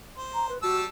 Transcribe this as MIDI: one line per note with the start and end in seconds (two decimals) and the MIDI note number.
0.17 0.53 72
0.34 0.48 82
0.49 0.58 71
0.63 0.86 55
0.63 0.81 66
0.63 0.86 81
0.63 0.86 88